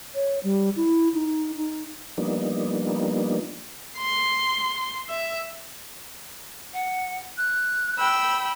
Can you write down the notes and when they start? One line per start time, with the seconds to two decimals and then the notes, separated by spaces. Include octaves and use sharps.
0.15 C#5
0.43 G3
0.76 E4
1.14 D#4
1.56 D#4
2.18 F3 G3 A#3 B3 D4 D#4
3.97 C6
5.09 E5
6.74 F#5
7.37 F#6
7.98 G5 B5 E6